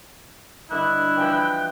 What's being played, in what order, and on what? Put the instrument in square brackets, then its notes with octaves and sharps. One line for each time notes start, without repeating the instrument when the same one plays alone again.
[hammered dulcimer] G2 D3 D#5 [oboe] E4 [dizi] F#6
[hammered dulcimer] E3 F3 B4 [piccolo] G5